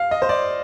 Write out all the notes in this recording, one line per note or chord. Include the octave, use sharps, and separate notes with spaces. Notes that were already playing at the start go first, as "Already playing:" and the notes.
Already playing: F5
D#5
C5
D5